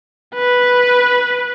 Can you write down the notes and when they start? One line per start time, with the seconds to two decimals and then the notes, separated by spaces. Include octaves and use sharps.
0.35 B4